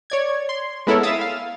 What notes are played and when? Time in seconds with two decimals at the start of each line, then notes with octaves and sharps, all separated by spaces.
0.10 C#5 D5 G#6
0.49 C6
0.87 G#3 B3 E4 A4 A#4 C#5
1.03 E5 F5 D#6 E6 A6
1.21 F5